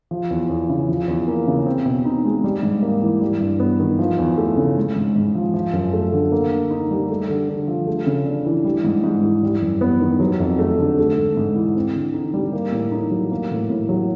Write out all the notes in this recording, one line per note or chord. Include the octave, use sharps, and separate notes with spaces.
F3
E2
E2
C#3
F3
E2
A#3
C#3
C4
B2
D#4
G#3
G3
G#2
A#3
E3
G3
G2
B3
D#3
F3
E2
A3
C#3
G#3
G#2
G#2
F3
F3
F#2
A3
D3
A#3
D3
D#4
G3
A3
D3
D3
F3
A3
C#3
D4
E3
G3
G#2
G#2
E3
G3
F#2
B3
D#3
F#3
F2
A3
D3
A3
G#2
G#2
E3
C4
D3
D#4
G3
A#3
A2
D#4
F#3
A#3
A2
A2
F#3